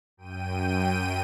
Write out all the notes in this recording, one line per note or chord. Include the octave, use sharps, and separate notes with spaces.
F#2 G5 D#7